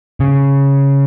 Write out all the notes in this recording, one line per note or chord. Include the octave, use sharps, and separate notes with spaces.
C#3